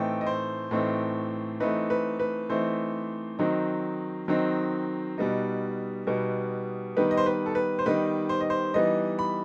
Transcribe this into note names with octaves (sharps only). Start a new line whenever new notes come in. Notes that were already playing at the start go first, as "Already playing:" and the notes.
Already playing: A2 E3 A3 C4 D#4 G5
D#5
C5
A2 E3 A3 C4 D#4
E3 A3 C4 D#4 B4
B4
B4
E3 A3 C4 D#4 C5
D#3 F#3 C4 D#4
D#3 F#3 C4 D#4
B2 G3 B3 D#4
B2 G3 B3 D#4
D#3 G3 B3 D#4 B4
D#5
C5
B4
A4
B4
C5
D#3 G3 B3 D#4 B4
C5
D#5
C5
E3 G3 B3 D#4 D#5
B5